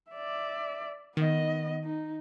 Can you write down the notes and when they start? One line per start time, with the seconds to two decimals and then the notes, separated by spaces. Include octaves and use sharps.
0.11 D5 E5
1.17 D#3 B3 D#5
1.84 D#4